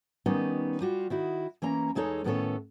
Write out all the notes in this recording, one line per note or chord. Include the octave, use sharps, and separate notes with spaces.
D#3 G3 B3 C#4 D#4
G3 F4 F#4
D#3 E4 F#4
E3 A#3 C#4 A#5
E2 G#3 D#4 A4 C#5
A2 D#3 B3 C#4 A4 C#5